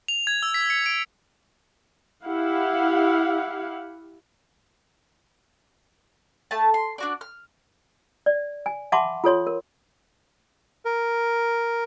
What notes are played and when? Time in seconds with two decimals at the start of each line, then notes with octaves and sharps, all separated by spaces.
0.08 F7
0.27 G#6
0.43 E6
0.54 B6
0.70 C#7
0.86 D7
2.24 E4 G4 F5 F#5
6.51 A3 A5
6.74 C6
6.98 D4 F#4 D5
7.21 F6
8.26 D5
8.66 G#5
8.92 E5 F#5 A5 B5 C6 D6
9.24 F4 A4 C#5 C6
9.47 A#4
10.85 A#4